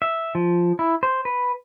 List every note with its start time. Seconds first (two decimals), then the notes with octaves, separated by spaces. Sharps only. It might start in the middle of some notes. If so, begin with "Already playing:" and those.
0.02 E5
0.35 F3
0.79 E4
1.03 C5
1.25 B4